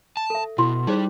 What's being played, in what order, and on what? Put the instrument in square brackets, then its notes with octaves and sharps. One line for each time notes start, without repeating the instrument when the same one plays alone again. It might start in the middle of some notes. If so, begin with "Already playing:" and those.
[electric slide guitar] A5
[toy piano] A4 E5
[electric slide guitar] B2 [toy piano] E4 B5 C6
[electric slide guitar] G3 [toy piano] D#4 G#4 C5